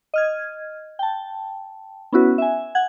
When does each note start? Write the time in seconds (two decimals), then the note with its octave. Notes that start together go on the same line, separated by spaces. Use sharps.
0.14 D#5 F6 G#6
0.99 G5 A5
2.12 B3 C#4 E4 F#4 B4
2.38 E5 G#5
2.75 F#5 G#6